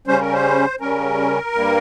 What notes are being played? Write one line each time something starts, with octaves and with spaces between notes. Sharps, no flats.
C#3 G3 C#4 C5
A#4
C5
C#3 G3 C#4 A#4
G2 G3 A#3